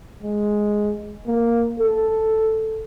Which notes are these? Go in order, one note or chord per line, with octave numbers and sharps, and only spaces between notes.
G#3
A#3
A4